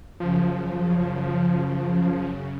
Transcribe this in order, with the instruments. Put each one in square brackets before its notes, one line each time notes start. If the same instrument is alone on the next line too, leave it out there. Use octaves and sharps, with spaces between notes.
[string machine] F#2 C#3 [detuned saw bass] F3